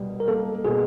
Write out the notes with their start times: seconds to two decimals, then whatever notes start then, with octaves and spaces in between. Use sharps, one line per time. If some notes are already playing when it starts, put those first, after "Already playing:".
Already playing: C2 B2 G3
0.20 A#4
0.28 A#3 A4
0.65 B2 G#4